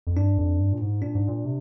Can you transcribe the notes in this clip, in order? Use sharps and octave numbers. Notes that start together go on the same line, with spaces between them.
F2
G2 D4
F2
G2
A#2
G#2
A#2 D4
G#2
A#2
C3